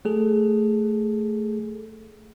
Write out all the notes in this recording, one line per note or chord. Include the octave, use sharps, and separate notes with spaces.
A3 G#4 A4